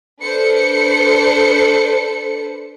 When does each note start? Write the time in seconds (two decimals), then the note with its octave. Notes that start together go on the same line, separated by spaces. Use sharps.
0.21 D4 A4 B4 C5 C#7